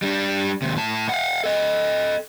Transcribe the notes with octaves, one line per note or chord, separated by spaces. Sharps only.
G3 D4
D#2 C3
A2 A5
F5 F#5
A4 D#5